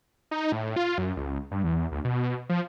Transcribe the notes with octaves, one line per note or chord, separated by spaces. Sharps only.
D#4
A2
F4
F#2
C#2
G2
E2
D2
B2
F3